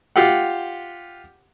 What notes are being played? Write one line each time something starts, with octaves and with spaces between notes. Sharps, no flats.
F4 G4 F#5